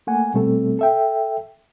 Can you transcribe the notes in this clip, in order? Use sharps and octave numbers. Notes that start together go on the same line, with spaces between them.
A3 A#3 F#5 G#5
B2 G3 A3 C4 A4
A4 E5 G5